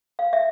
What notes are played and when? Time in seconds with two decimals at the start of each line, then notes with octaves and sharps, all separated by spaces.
0.19 F5
0.33 E5